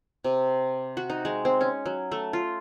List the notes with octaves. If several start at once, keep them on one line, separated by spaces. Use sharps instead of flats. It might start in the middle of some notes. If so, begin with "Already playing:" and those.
C3
F#4
D#4
G#3
C4
C#4
F#3
A3
F4